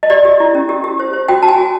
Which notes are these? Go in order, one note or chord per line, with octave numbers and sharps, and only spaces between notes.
D#5
G4 D5
G4
E4
C#4
G4
G4
C5
C5
F#4 G5
F#4 A5
G#5
F#4